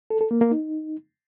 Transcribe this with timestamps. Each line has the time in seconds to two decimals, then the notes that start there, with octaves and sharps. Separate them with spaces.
0.10 A4
0.21 A4
0.31 A#3
0.41 A#3
0.51 D#4